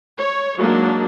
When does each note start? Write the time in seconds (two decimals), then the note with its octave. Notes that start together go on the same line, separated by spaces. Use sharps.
0.17 C#5
0.58 F#3 G#3 A#3 D4 D#4